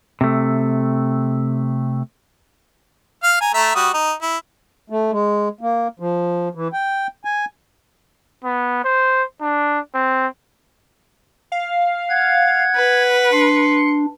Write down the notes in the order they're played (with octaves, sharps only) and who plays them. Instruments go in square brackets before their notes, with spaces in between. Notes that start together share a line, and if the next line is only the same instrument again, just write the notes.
[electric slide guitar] C3 A3
[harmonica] F5 F6
G#5 A#5
A3 E5 A#5
G3 F#4 D#6
D#4
E4
[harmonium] A3
G#3
A#3
F3
E3
G5
G#5
[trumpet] B3
C5
D4
C4
[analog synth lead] F5
[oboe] F#5 [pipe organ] G#6
[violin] B4
[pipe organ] D4 [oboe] C6 [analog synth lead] C#7